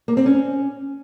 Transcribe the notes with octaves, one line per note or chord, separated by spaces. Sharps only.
A#3
C4
C#4